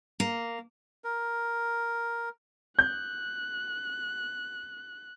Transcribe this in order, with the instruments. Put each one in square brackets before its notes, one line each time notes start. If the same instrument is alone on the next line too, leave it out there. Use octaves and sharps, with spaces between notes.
[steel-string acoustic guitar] A#3
[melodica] A#4
[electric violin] F#6 [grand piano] G6